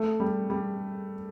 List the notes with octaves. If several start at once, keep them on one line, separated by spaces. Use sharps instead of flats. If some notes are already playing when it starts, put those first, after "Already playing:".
Already playing: A3
G3
G3